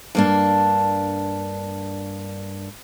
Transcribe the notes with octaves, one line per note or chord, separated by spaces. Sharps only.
G2 A#3 D4